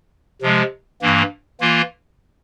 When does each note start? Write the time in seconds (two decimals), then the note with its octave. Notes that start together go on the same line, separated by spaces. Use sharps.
0.42 C3 F3 G#3
1.02 G2 E3 A#3
1.61 E3 A#3 F4